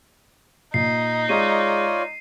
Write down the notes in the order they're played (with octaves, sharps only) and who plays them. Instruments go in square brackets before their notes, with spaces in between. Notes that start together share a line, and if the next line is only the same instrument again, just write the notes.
[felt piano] A#2 [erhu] D#4 [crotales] C7
[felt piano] G#3 [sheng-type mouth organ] F4 C#5 D5 [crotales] D#7